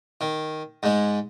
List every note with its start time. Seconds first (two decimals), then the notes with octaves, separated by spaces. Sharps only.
0.21 D#3
0.83 G#2 G#3